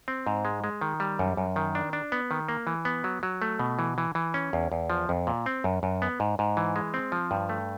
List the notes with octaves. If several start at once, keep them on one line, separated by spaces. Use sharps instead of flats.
C4
G#2
G#3
G#3
D#3
G3
F#2
F#2
D#3
D4
D4
B3
D#3
A#3
E3
B3
F#3
F#3
A3
B2
E3
E3
E3
C#4
E2
E2
F3
F2
A#2
C4
F#2
F#2
B3
G#2
G#2
E3
G#3
C4
F3
G2
A3